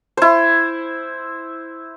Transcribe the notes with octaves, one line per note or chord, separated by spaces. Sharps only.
E4 C5